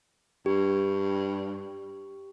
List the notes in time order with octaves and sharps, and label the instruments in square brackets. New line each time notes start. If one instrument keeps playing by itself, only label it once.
[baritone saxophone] G2 [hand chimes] G4